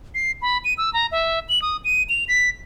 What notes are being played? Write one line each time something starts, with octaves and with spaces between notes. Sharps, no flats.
C7
B5
D#7
E6
A#5
E5
F#7
D#6
D#7
F7
B6